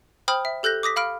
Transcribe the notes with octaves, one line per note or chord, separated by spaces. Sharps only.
C5 G5 B5 D#6 F6 F#7
E5
G4 A4 F#6 G6 A#6
D6 D#6 A#6 B6
F5 B5 F6 D7